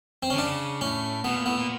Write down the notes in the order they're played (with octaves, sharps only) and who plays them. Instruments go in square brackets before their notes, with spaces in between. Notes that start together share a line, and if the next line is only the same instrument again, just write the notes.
[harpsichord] C4
[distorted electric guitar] D3 [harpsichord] C#4
[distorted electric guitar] C#3 [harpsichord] D4
[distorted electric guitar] A2 [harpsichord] C#4
[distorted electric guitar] B2 [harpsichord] B3
[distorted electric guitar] A#2
[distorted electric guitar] A2 [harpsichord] B3
[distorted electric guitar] A#2